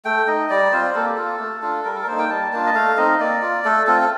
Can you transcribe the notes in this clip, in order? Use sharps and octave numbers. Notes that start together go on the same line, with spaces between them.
A3 G5
D#4 D#5
G3 D5
C4 F4 C5
A#3 A4
G4
F4 A4
A3
D4 F4
G3 A#4
A4
A#4
A#3 D#4 C5
G5
G3 A5
A#3 D4 F4 A5
D#5
A3 F5
C4 D#4 D#5
A#3 D5
F4
A3 A4
C4 F4 A4
A4